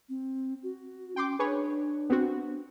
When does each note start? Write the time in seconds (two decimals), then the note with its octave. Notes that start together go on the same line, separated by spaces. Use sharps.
0.09 C4
0.63 F#4
1.16 C#4 G5 C6 D6
1.39 D4 G#4 B4 C#5
2.10 B3 C4 F#4